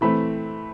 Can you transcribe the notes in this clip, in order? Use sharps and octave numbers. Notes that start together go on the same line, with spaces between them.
E3 A3 C4 B5